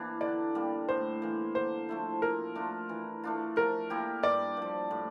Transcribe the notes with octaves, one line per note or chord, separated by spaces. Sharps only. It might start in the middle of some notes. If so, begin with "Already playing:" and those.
Already playing: E3 A#3 D4
D3 D5
G3 A#3
A2 C5
E3 A#3
D3 C5
F3 A3 E4
A#2 A#4
A3 D4 F4
E3
A3 D4 F4
F3 A#4
A#3 E4 G4
G2 D5
F3 A#3
A2